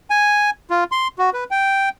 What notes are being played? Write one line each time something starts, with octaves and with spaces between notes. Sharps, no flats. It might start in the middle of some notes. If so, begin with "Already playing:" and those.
G#5
F4
C6
F#4
B4
G5